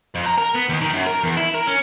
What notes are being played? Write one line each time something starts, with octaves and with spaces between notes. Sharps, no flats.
F2
A#5
A#4
B3
D#2
D#3
F#2
A#4
E2
E4
A#4
C#4